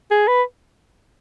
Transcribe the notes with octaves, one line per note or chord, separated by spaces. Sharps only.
G#4
B4